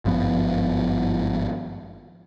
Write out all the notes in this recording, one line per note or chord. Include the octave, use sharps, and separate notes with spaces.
G#1 G2 F3 B3